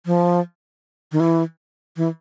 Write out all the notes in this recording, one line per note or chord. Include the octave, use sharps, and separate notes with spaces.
F3
D#3
E3
E3